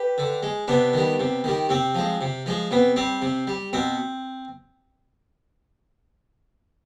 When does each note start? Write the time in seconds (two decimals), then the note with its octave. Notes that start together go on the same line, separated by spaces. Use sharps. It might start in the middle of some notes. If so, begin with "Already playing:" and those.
Already playing: G4 B4
0.18 D3
0.43 G#3
0.68 C3 B3 D4
0.93 D#3 G3
1.20 C3
1.44 D#3 G3
1.69 C3 C4
1.95 F3 G#3
2.21 C3
2.46 F3 G#3
2.71 C3 B3
2.96 G3 C4
3.22 C3
3.47 G3
3.73 B2 C4